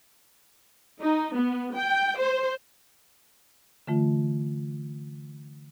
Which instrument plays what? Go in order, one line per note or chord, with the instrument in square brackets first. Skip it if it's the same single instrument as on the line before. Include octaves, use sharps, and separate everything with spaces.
[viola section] D#4
B3
G5
C5
[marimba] D3 E3 A3 F4